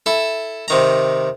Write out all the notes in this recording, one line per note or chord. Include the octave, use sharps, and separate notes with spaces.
E4 A4
C3 D#3 A#5